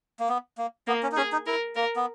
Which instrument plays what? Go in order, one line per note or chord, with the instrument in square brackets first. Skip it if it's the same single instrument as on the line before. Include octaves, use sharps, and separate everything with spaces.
[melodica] A#3
B3
A#3
[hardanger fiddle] A#3 [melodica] B3
[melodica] C#4
D#4
[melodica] C#4 [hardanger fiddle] G#4
[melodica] D#4
[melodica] E4 [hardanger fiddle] A#4
[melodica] A#3 [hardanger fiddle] A#4
[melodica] B3